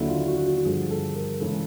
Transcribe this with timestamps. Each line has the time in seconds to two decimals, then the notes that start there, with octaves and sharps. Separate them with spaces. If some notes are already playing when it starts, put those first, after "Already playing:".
Already playing: D#2 D3 F#3 E4
0.08 F4
0.27 F#4
0.46 F#4
0.65 G2 D3 F3 G#4
0.91 A4
1.15 A#4
1.40 C#3 E3 G#3 A4